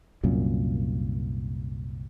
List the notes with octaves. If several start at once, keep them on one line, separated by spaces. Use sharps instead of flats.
C2 F#2 A#2